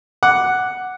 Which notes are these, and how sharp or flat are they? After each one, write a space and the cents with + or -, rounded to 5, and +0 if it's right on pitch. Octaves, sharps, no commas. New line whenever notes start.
F#5 +0 D6 +0